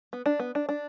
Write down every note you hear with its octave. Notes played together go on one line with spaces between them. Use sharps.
B3
D4
B3
D4
D4